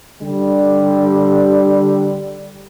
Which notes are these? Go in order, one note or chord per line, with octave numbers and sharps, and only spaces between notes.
D3 G3